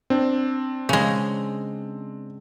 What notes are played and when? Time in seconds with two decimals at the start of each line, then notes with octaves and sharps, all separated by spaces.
0.10 C4 D4
0.89 C#3 G#3